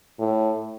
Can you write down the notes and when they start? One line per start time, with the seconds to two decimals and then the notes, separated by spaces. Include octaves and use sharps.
0.19 A2